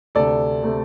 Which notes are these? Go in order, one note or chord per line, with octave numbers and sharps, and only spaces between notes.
D2 C3 A3 A4 D5
C3 A3